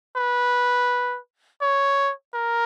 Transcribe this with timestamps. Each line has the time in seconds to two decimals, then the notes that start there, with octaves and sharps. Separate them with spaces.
0.16 B4
1.62 C#5
2.34 A#4